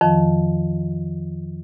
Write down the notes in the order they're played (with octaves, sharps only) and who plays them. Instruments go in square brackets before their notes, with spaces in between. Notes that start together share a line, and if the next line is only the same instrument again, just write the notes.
[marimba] F2 D#3 F3